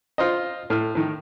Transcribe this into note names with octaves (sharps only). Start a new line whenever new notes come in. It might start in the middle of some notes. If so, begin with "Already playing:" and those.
F4 C5 D#5
A2 F6
A2 D#3